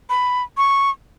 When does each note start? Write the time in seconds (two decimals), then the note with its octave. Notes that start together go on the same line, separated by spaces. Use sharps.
0.10 B5
0.57 C#6